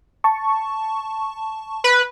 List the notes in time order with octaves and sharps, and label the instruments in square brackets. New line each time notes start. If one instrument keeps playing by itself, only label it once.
[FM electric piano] A5 C#6
[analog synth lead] B4